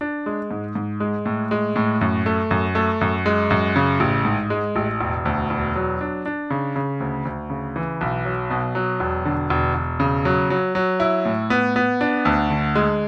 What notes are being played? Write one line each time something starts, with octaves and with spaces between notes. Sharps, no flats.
D4
G#3
G#2
G#2
G#3
A2
G#3
A2
F#2
A3
F#2
A3
F#2
G#3
F#2
C#3
A1
G#2
G#3
A1
E1
D2
E1
F#3
D4
D4
C#3
C#3
D2
D2
C#3
E3
B1
F#3
B2
F#3
E1
D3
E1
E1
C#3
F#3
F#3
F#3
E4
A2
B3
B3
D4
D2
D3
G#3